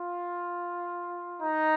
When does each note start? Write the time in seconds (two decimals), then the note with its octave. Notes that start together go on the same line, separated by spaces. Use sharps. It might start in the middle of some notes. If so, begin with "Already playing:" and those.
Already playing: F4
1.41 D#4